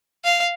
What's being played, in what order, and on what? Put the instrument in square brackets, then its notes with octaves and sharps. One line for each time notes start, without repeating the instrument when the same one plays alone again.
[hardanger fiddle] F5